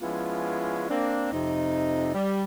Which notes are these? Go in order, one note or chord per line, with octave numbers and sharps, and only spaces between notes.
F3 G#3 B3 C#4 E4 F4
A#3 C4 D4
F2 C3 D#4
G3